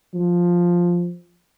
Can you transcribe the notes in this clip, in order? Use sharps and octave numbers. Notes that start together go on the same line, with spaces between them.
F3